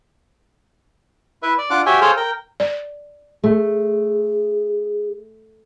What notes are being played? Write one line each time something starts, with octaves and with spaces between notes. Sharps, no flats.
E4 B4 E5
D5
D4 F4 F#5 D6
F#4 G4 C#5 E5 G5 G#5
G#4 A4 C5 C#5 F5 G5
A#4 G5
D5
A3 G#4